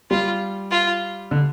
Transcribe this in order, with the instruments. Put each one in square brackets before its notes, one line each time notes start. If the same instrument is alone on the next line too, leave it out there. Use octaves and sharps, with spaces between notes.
[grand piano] G3 [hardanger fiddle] F4
[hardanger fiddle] F4
[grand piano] D3